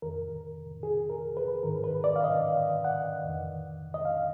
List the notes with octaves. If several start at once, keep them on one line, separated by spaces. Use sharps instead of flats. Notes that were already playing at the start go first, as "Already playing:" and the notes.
F2 D#3 A#4
G#4
A#4
B4
G#2 D#3 A#4
B4
D5
F5
D#5
F#5
F2 D#3
D#5
F5